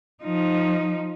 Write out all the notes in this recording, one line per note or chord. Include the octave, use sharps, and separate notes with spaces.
F3 D#4